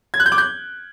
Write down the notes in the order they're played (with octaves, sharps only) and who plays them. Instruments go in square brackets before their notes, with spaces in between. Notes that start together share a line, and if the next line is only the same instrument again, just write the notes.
[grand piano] G#6
F#6
G6
D6
G6